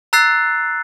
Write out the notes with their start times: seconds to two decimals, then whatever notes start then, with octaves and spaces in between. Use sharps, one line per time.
0.13 A#5 E6 F#6 A6 C7